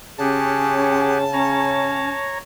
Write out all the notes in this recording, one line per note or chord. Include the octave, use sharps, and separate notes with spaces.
C#3 C#4 G4 G#4 F#5 A5
C#4 C#5 A#5